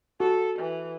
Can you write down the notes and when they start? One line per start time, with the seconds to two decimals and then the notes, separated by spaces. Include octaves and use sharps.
0.20 F#4 A4
0.59 E3